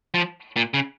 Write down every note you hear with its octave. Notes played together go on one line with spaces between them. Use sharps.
F3
A#2
C#3